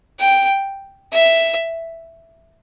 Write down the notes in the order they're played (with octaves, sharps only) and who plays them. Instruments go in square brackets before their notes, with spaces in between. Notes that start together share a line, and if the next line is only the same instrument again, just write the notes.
[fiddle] G5
E5